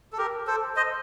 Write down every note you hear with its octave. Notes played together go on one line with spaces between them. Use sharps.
A4
G4 A#4
A4 C5
C5 D#5